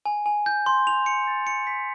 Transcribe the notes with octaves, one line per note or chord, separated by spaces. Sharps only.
G#5
G#5
G6
C6
F7
C#7
A6
C#7
B6